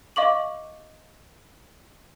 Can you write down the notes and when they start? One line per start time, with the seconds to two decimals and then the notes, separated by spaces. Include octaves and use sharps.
0.16 D#5 F5 C#6 D6 F#7